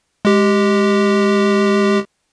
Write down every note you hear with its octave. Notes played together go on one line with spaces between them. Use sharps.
G#3 G4